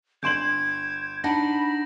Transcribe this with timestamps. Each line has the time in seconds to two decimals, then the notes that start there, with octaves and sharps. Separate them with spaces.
0.23 G1 C6 G6 G#6 D7 E7 F#7
1.24 D4 D#4 F#5 B5 A#6